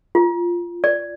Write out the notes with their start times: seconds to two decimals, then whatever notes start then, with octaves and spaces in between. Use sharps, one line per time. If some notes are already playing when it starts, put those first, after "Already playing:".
0.15 F4
0.84 D5